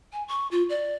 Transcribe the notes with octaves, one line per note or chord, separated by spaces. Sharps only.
G#5
C#6
F4
D5